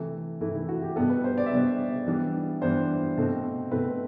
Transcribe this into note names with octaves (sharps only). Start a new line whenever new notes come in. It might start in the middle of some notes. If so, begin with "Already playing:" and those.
Already playing: C3 E3 A3
C3 E3 A3 E4
E4
F#4
G4
B2 G3 B3 A4
B4
C5
D5
E5
B2 G3 B3 D5
E3 G3 B3 D4
E3 G3 B3 D4 C5
B2 A3 C4
B2 A3 C4 B4